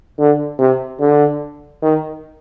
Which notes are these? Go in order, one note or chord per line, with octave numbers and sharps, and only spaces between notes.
D3
C3
D3
D#3